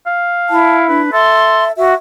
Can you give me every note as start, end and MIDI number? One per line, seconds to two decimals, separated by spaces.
0.06 0.87 77
0.50 1.00 64
0.50 0.76 81
0.89 1.10 62
0.89 1.08 71
1.13 1.69 69
1.13 1.72 76
1.13 1.64 84
1.77 1.93 66
1.77 1.94 76